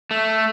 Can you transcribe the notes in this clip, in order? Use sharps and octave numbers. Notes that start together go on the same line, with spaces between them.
A3